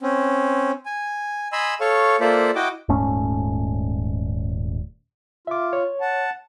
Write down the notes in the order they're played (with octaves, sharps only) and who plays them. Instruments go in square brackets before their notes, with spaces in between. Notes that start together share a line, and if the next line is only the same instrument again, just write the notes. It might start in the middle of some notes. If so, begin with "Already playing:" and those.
[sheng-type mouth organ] C4 C#4
G#5
D#5 G#5 B5 C6 E6
A4 C#5 F5 C#6
A#3 F4 A4 C5 D5 E5
E4 F#4 D#5 G5 D6
[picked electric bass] D#1 G#2 A3 C#4
[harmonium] F4 [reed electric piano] E5 D6
[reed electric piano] C#5
[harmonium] F#5 A5